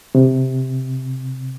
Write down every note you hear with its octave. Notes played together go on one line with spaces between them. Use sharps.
C3